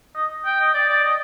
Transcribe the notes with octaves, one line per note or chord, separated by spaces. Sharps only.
D#5
G5
D#5
D5
D5
D#5